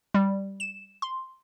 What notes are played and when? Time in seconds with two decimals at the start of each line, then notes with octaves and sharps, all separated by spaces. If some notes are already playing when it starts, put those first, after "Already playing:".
0.14 G3
0.60 E7
1.02 C6